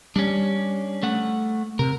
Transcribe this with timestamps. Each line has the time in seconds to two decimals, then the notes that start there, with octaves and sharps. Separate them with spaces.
0.16 G3 C#4 D4
1.03 A3 F#5
1.79 C3 A#4